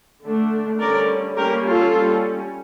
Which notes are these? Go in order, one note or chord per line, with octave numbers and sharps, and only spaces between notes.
D3 A3 D4
D3 G3 C#4 A#4 D5
G3 A#3 C#4 G4 A#4
F4 A4
G3 C#4